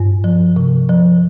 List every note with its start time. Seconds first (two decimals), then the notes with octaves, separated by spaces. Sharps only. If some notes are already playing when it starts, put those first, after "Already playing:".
Already playing: G2
0.24 F3
0.56 C3
0.89 F3